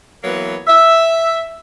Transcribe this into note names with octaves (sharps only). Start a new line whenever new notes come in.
E3 F#3 A#3 B3 C#5
E5